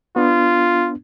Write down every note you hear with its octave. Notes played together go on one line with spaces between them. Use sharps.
B3 D4 F4